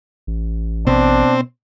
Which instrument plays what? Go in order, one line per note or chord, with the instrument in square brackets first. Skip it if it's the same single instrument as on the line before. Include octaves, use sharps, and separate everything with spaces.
[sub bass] A1
[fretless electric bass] B2 B3 [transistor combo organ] C4 [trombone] D4